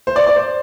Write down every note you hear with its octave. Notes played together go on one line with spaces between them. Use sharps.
C5
D5
D5
C5